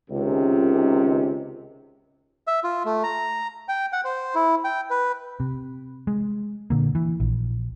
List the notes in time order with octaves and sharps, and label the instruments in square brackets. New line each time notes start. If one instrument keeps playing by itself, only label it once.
[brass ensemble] C#2 C3 D#3
[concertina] E5
F4
A3
A#5
G5
F#5
C5
E4
G5
B4
[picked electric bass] C3
G#3
A#2 D3 A#3
E3
A#1